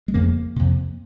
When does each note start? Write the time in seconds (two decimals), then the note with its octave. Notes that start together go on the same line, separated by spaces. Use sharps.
0.08 G#3
0.14 F2 C#3 A#3
0.56 F2 C3